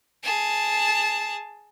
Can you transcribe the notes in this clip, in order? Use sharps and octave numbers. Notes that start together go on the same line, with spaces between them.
G#4 A5